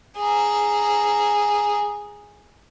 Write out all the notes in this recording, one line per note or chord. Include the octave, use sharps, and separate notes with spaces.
G#4 A#5